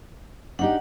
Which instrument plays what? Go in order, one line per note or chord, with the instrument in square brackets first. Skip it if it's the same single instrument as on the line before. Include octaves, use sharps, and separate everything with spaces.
[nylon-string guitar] D4 D#4 G4 [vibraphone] F#5